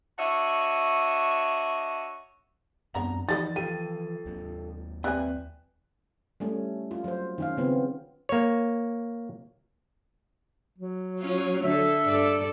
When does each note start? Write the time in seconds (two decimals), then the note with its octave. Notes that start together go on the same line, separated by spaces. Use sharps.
0.17 D4 F#4 C#5 D#5 E5
2.95 F#2 G3 B3 C4 D4 A#5
3.29 E3 F3 G3 D#4 F#4 G#4 D#5 A6
3.56 F4 G4 A4 D#7
4.26 D#2 F#3
5.04 G3 C4 B4 E5 G#5 F#6
6.40 G3 A3 C#4
6.91 F4
7.04 F#3 C5
7.38 D#3 C#4 F5
7.57 C#3 B3 C4 F4
8.29 A#3 C#5
10.78 F#3
11.19 C#4 F4
11.64 D3 A4 E5
12.07 G2 A4 D5